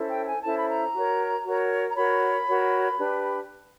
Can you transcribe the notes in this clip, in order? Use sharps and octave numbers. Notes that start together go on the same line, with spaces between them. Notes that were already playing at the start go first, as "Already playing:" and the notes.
Already playing: C#4 E4 A4 C5
G5
G#5
C#4 E4 A4 C5 A5
B5
A#5
F#4 A#4 C#5
F#4 A#4 C#5
A#5
F#4 A#4 C#5 B5
F#4 A#4 C#5
D4 G4 B4